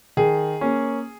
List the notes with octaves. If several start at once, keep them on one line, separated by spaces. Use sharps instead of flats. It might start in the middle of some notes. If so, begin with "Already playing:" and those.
D#3 G#4
A#3 C#4